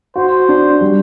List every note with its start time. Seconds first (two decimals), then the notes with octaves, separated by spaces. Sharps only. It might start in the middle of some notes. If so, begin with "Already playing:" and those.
0.16 F#4 C5
0.49 D4
0.81 G3